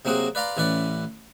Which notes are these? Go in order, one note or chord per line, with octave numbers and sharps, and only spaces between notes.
C3 F#3 A#3 C4 F#4 G#4
B4 D5 F5 A#5 C6
A1 E3 C#4 B4 D5